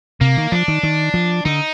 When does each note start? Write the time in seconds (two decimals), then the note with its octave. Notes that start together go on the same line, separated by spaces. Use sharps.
0.21 C3 A#3
0.37 D#3
0.52 F3 D4
0.68 D#3
0.83 D#3
1.14 F3
1.45 D3 D#4